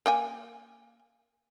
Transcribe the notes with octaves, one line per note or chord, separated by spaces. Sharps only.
A#3 G5 G#5